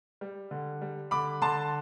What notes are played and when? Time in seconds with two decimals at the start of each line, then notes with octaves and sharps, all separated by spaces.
0.21 G3
0.51 D3
0.82 G3
1.11 D3 B5 D6
1.42 D3 A5 C6